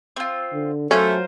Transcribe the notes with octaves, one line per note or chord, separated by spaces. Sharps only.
C4 F4
D3
F#3 A3 C#4 F4 A#4 C5